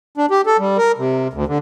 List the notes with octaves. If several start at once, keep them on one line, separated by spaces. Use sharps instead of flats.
D4
G4
A4
G3
A#4
C3
D2
D3